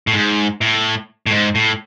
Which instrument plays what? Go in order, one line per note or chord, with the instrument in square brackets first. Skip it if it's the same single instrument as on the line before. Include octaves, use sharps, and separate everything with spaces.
[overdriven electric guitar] A2
G#2
A2
A2
G#2
A2